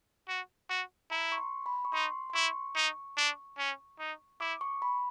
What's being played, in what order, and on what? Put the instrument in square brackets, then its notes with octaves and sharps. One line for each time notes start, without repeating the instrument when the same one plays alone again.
[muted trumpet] F#4
F#4
[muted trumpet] E4 [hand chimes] A#5
[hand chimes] C#6
C6
B5
C#6
[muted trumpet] D#4 [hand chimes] C6
[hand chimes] C6
[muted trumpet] E4 [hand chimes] C#6
[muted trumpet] D#4
D4
C#4
D#4
[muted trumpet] E4 [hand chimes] D6
[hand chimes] C#6
B5